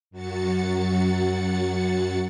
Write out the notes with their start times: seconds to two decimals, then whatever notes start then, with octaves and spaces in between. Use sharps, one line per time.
0.11 F#2 F#3 F#4 A6 C#7